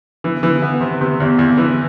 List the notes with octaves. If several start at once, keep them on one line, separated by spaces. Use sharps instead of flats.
E3
E3
B3
C3
C3
E2
E2
E3